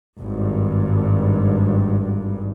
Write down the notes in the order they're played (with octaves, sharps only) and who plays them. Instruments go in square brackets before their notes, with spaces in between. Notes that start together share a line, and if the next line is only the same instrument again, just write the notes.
[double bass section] G#1 G2